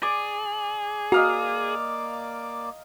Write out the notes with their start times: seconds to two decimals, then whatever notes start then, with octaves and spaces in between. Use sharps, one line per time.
0.03 G#4 D5
1.12 A#3 F#4 D5 D#5 F5 A#5 D6